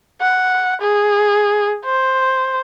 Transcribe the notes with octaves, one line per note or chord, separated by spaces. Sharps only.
F#5
G#4
C5